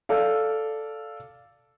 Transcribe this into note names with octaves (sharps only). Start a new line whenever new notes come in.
A4 D5 F5